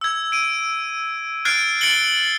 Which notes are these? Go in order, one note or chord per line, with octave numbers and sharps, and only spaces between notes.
E6 G#6
D7 D#7
F6 F#6 G#6 A6 C7 D7
A6 C#7 D7 F#7 G7